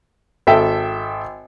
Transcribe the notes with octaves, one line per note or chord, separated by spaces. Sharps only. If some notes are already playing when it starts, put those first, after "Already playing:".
G#1 A4 E5 G5